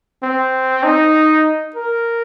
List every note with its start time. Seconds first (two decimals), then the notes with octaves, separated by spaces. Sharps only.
0.23 C4
0.84 D#4
1.76 A#4